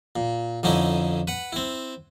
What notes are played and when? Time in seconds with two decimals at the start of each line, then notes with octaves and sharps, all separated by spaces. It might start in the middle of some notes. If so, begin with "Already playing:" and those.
0.16 A#2
0.63 F2 D3 C#4 D#4 E4
1.28 B4 F#5
1.53 C4 E4